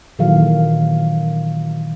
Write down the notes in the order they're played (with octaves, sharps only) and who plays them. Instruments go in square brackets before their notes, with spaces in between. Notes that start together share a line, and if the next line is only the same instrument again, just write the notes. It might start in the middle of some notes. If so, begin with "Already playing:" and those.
[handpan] A#2 D#3 E3 F#3 A4 F5